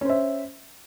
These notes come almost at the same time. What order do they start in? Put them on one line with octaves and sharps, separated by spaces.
C#4 C5 E5